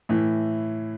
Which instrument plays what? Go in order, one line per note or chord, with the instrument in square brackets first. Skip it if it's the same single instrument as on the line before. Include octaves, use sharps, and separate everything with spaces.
[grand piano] A2 E3